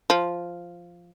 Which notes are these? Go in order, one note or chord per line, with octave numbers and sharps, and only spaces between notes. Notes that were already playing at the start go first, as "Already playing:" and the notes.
F3